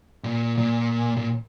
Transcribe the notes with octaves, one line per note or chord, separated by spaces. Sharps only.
A#2
A#2
A#2